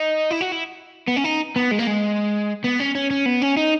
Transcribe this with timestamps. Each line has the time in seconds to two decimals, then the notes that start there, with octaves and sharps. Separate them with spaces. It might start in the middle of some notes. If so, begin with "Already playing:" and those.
Already playing: D#4
0.31 E4
0.41 F#4
0.52 E4
1.08 B3
1.17 C#4
1.24 D#4
1.56 B3
1.71 G#3
1.79 A#3
1.87 G#3
2.64 B3
2.80 C#4
2.95 C#4
3.10 C#4
3.26 B3
3.42 C#4
3.57 D#4